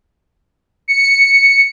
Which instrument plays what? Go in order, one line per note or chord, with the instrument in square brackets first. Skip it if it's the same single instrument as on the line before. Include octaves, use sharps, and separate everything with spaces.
[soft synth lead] C#7